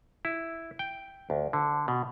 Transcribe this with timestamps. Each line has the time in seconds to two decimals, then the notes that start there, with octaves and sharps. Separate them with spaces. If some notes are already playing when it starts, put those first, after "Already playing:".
0.25 E4
0.79 G5
1.30 D2
1.53 D3
1.88 B2